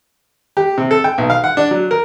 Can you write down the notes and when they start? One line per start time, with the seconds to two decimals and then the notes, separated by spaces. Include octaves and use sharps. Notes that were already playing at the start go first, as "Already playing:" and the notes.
0.57 G4
0.78 C3
0.91 A4
1.04 G5
1.18 B1
1.30 F5
1.44 F#5
1.57 D4
1.71 F#3
1.91 A#4